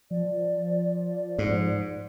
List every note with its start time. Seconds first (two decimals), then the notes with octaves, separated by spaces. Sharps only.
0.11 F3 D5
1.39 G#2